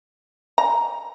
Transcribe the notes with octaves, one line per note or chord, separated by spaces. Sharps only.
A#5